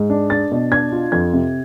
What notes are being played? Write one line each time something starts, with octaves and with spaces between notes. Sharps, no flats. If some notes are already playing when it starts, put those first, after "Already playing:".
Already playing: G#2
D4
D4 A6
B2
D4 G#6
F4
F2 G#6
C3